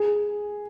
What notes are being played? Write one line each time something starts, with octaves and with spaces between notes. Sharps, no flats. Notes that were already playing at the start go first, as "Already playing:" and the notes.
Already playing: G#4